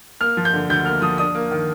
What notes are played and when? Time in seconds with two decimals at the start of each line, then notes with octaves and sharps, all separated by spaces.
0.21 A#3 F6
0.37 F3
0.45 G6
0.53 D3
0.69 D2 G6
0.86 A#3 F6
1.02 F3 D#6
1.18 D4 D#6
1.35 A#3
1.51 D#3